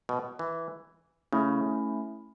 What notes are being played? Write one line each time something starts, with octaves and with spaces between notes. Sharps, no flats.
B2
E3
C#3 A3 C#4 E4